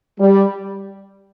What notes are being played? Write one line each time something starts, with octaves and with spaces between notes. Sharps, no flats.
G3